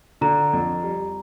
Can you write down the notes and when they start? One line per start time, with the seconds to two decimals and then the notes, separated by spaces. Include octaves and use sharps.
0.21 D3 A#5
0.53 F2
0.83 G3